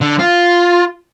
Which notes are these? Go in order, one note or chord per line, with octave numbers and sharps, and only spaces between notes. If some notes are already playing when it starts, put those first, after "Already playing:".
D3
F4